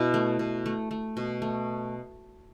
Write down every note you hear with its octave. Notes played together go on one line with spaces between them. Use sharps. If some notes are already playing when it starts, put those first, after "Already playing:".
Already playing: B2 E4
A3
B2
A3
A3
B2
A3